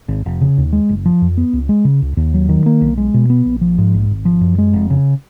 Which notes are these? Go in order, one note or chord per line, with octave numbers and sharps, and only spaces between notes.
G#1
F1
C#3
D#2
G#3
F#1
F3
F2
B3
C#2
G#3
C#3
C#2
D#2
F#3
D#3
A#3
B1
G#3
B2
B3
A#1
F3
G#2
A#1
G#1
F3
F#2
G#3
F1
C#3